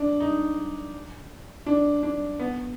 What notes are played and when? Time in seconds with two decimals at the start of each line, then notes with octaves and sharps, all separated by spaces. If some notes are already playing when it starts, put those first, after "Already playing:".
Already playing: D4
0.20 D#4
1.66 D4
2.03 D4
2.40 B3